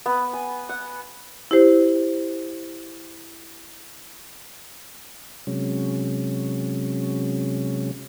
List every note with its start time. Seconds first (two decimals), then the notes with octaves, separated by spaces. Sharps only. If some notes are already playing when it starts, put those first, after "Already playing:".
0.06 B3
0.33 G#5
0.69 F#5
1.51 E4 G4 C5
5.47 C3 F#3 G#3 C#4